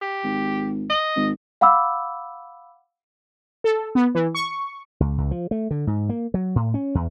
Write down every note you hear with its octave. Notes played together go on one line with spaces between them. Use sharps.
G4
G#1
D#5
G#1
F5 F#5 B5 D6 E6
A4
B3
E3
C#6
C#2
C#2
F3
A3
D3
G#2
A#3
F#3
A2
C#4
E2